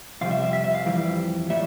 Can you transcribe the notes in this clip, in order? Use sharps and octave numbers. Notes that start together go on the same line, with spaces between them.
F2 C3 G3 F5
E5
E5
E5
E5
F5
F2 E3 G3
A2 G3 E5